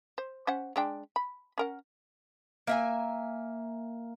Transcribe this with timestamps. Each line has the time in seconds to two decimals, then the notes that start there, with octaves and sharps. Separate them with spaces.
0.18 C5
0.47 C#4 C5 F#5
0.76 G#3 D4 G5
1.16 B5
1.58 C#4 A#4 F#5
2.67 A#3 E5 G#5